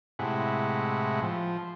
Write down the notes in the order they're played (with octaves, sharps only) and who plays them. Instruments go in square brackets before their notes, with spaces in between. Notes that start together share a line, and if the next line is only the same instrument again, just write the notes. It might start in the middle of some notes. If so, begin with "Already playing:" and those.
[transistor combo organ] A2 C3 G#3 E4 F#5
F3